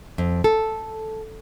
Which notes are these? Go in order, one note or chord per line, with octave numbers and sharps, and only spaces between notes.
F2
A4